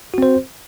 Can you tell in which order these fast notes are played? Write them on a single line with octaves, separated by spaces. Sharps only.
F#4 C4 C5